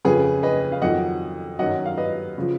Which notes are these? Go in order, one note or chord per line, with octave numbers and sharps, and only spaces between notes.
F2 C#3 F3 G#4 B4
B4 D#5
F5
F2 D#3 F#3 D#5 F#5
F#2 D#3 F#3 D#5 F#5
F5
B4 D#5
C#3 F3